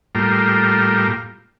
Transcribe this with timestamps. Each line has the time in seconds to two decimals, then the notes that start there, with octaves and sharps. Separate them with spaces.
0.15 A2 G3 A#3 F4